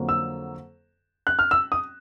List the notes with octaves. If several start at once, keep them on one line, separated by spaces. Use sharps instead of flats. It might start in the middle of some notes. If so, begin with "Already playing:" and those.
Already playing: F2 D3 F#3 A#3
E6
F#6
F6
E6
D#6